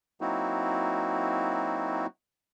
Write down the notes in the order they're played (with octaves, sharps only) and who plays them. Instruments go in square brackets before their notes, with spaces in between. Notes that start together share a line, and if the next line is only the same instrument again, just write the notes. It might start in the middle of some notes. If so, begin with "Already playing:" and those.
[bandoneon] F#3 A#3 C4 D#4 E4 F#4